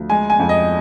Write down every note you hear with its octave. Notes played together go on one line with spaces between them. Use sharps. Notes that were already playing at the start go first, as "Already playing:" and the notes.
Already playing: D2 F3
G#3 G#5
G#5
F2
D#5